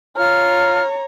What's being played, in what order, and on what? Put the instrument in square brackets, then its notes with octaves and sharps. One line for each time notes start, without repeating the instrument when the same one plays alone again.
[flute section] F4 F6 [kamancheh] C#5 A#5